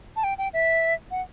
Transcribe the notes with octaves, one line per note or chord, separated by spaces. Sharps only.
A5
G5
G5
E5
F#5